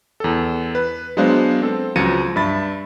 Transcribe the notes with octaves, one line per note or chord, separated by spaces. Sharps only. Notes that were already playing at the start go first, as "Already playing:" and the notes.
E2 A4
B4
F#3 G#3 B3 D4 C5 F5
C4 A4
C#2 F3 F#3 A#6 C#7 D#7
G2 E5 B5 A6